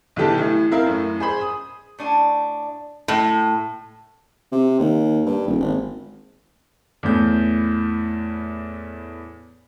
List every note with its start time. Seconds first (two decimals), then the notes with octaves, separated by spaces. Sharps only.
0.16 B1 D3 E3 G4 A5
0.38 A2 E3
0.71 C4 E4 A#4 E5 F5
0.86 F#2 A2
1.20 G#4 C5 B5
1.41 D#6
1.99 A2 D4 G#5
3.08 A2
4.52 C3
4.80 D#2
5.26 G2
5.47 D#1
5.60 G#1
7.03 E2 A2 G6